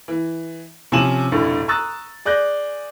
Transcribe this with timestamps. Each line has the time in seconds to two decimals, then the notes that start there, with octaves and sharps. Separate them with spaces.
0.08 E3
0.92 C3 F3 C#4 G#5 E7 F#7
1.32 F1 B1 A2 D3
1.68 A#5 C#6 D#6 E6 F#6 A6
2.25 G#4 D5 F#6 G6 A#6